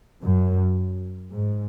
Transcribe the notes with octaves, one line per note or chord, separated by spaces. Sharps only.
F#2
G#2